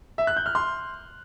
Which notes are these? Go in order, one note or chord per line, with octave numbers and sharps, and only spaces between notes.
E5
F#6
G6
F6
C6